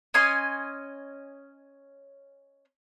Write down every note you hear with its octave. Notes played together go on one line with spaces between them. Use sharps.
C#4 D#5 G#5 C6